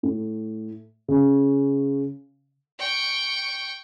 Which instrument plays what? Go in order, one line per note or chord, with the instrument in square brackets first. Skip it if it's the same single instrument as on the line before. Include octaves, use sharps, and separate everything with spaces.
[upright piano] A2
C#3
[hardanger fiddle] G5 C#6